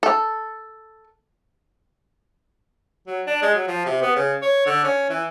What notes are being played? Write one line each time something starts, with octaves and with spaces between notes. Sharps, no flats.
A4
F#3
D4
G#3
F#3
F3
C3
B3
C#3
C#5
D3
C#4
E3